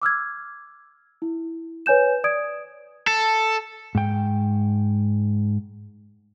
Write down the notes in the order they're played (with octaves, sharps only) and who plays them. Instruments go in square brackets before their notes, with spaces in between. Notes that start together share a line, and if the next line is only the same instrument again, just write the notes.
[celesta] D6 E6 F6 G#6
E4
B4 C#5 G#5 G6 E7
D5 D#6 G#6 D7
[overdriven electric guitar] A4
[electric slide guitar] G#2 G5